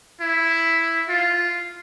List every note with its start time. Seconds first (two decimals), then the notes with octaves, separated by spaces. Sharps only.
0.21 E4
1.09 F4